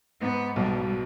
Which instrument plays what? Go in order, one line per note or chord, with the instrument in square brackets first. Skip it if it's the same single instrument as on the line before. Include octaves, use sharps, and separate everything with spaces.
[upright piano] G#2 [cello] B3
[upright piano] B1 B2 [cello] G3